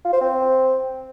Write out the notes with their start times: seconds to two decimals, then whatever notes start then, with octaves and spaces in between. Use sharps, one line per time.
0.04 F4
0.13 C5
0.21 C4